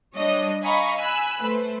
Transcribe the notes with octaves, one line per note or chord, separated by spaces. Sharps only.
G3 D4 C#5 D#5
D#5 F5 G#5 A#5 B5 C#6
G#5 B5 E6 F#6
A3 B4 C5